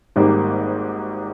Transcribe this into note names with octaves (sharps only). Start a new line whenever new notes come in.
G#1 G#2 G3 A#3